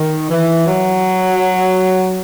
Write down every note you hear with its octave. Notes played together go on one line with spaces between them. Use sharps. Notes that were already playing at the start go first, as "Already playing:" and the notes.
Already playing: D#3
E3
F#3